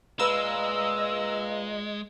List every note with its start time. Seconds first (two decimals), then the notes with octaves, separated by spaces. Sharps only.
0.20 A#2 G#3 B4 D#5 F5 A#5 E6